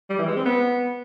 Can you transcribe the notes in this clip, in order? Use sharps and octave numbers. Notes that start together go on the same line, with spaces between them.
G3
E3
G#3
C4
B3